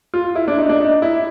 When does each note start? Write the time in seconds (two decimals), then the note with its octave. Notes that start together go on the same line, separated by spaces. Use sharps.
0.14 F4
0.35 E4
0.48 D4
0.58 D#4
0.69 D4
0.80 D#4
1.02 E4